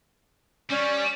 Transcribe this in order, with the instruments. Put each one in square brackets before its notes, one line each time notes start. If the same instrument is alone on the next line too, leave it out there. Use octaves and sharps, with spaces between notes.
[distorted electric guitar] G3 [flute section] C#4 D5